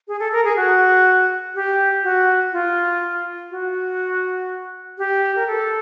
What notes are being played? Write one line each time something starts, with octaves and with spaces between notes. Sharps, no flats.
G#4
A4
A#4
G#4
F#4
G4
F#4
F4
F#4
G4
A#4
A4